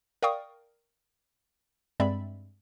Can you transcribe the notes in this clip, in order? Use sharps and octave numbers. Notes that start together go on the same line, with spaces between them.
A#4 D5 F5 G5 C#6 D#6
G2 G#3 C4 D5 E5 B5